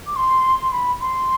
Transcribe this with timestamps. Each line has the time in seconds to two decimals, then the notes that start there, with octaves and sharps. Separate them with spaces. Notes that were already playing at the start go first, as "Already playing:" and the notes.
0.06 D6
0.15 C6
0.62 C6
0.71 B5
1.00 C6